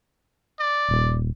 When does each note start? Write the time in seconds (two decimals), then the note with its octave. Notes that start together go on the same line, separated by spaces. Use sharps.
0.60 D5
0.89 D#1